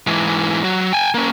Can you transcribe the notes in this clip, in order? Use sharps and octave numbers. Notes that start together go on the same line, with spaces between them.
G#2 E3
F#3 F#4
G5 G#5
A#3 C#4